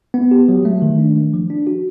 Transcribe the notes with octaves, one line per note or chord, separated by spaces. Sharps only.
B3
G4
F#3
A3
D#3
D4
A3
F3
D4
F#4